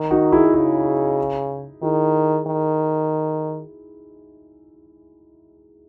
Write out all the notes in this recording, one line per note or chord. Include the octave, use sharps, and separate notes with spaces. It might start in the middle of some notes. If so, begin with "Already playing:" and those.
Already playing: D#3
D#4 F#4
E4 G#4
F#4
C#3 E4 G#4
D#3 E4 G#4
D#3